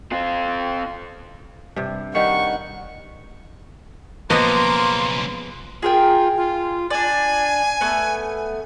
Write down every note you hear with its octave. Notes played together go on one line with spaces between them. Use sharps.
C4 F4
G2 C3
D#3 G3 D#4 F#5 C#6
B1 C#3 F3 A#3 B3 D#5 C6
F4 G#4 A#4 G5
F4
D4 D5 G#5
A3 B3